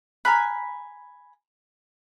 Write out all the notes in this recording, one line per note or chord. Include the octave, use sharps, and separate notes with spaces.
G#5 A#5 B5 F6 F#6